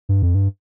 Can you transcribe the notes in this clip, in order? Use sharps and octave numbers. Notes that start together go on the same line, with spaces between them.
G2
F2
G2